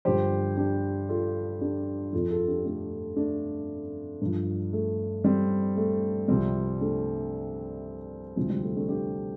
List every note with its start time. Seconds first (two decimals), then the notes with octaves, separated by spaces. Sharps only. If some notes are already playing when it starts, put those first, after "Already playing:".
0.05 G2 D3 F3 G4 C5
0.57 D4 G4
1.09 F4 A4
1.61 D4 G4
2.13 F2 F3 F4 A4
2.31 F4 A4
2.47 D4 G4
2.65 A3 D4
3.16 A3 D4
4.21 G2 F3
4.73 A3
5.24 G3 C4
5.77 A3
6.28 C2 C3 F3 G3 C4
6.81 A3 D4
8.36 D2 C3 F3 G3 C4
8.50 G3
8.63 A3
8.76 A3 D4
8.89 D4 G4